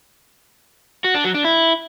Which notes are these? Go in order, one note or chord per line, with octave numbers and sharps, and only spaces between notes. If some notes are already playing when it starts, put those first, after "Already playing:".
F#4
D4
F#3
D4
E4